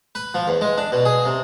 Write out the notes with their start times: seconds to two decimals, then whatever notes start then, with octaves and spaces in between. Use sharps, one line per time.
0.15 B4
0.34 F3
0.48 E2
0.61 G#3
0.78 D4
0.92 B2
1.05 G#4
1.25 C3